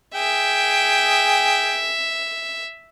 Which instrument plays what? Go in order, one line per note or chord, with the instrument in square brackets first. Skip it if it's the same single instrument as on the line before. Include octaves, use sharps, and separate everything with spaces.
[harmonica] G#4 G5 [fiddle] E5